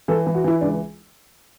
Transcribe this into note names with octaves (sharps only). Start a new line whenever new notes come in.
E3 A4
E3
F#4
E3 E4
C#2 D4